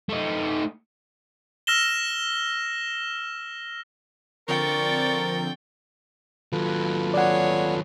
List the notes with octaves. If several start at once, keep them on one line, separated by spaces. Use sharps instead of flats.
A3 D#4
E6 F6 A#6 E7 G7
D3 F3 C4 A#4 D5 G5 C#6 A6
D#2 F#3 F4 A4 B4
G#4 C#5 D5 F#5